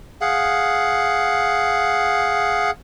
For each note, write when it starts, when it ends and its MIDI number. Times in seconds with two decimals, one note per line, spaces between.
0.21 2.71 68
0.21 2.71 77
0.21 2.71 78